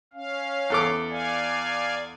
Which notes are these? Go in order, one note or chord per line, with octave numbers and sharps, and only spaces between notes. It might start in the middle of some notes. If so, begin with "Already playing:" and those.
C#4 F5
E2 A4 D6
D5 F5 G#5